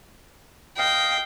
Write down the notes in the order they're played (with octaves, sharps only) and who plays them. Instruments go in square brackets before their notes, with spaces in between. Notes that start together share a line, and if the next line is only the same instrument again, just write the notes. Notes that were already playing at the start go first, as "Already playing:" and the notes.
[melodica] D#5 F5 [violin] G5